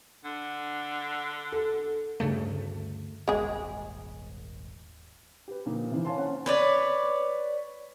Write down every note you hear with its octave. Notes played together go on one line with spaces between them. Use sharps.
D3
A4
D2 G2 C#3 A3
D#1 G#1 G#3 G#4
G4 B4
A#2 D3 F3 A#3 D#4
C3 D#3 E3 A#3 E4 C5
C#5 F5 G#5 A5 C6
C#4 C5 F#5 A5 C6
B4 C#5 D5